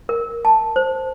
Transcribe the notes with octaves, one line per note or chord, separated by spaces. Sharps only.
A#4
A5
C5